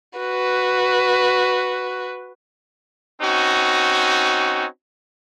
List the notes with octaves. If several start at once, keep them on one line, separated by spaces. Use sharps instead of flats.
F#4 B4
C4 C#4 D#4 F#4